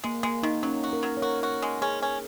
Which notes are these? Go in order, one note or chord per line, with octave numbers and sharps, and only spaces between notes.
G#3 A#3
G#3 A#3
D#3 D#4
F#3 C#4
F#4
A#4
F#3
C#5
F#4 A#4
F#4
G#3
C#4 G#4
C#4